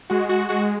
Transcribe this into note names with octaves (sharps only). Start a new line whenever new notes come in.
G#3 F#4
F#4
G#3 F#4